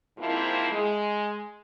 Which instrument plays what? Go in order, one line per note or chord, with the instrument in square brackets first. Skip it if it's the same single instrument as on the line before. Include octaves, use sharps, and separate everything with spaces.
[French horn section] G#2 F3 A#3 C4 E4
G#3